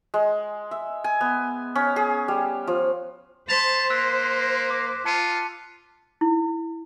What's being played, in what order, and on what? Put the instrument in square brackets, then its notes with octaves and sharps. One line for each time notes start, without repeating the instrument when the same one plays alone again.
[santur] G#3
E5
G#5
B3
C#4
G#4
G3
F3
[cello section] C5 [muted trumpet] A5 [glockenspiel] C6 B6 F7
[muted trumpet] A#3 [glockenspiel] E6 F#6 B6
[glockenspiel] D6
[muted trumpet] F4 [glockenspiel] A5 C#7 D#7
[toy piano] E4